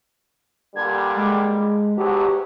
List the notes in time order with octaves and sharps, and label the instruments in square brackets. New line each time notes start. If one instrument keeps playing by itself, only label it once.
[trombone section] A#2 D3 G3 [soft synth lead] G#6
[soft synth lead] G#3
G#3
[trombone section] G#2 B2 F#3 [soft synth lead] G4